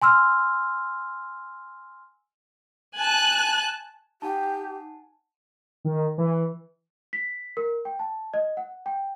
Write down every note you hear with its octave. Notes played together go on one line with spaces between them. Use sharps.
G#5 C6 E6 F6
G#5 A5 F#6
D#4 G4 F#5 G#5 A5
D#3
E3
B6
A#4
G5
A5
D#5
F#5
G5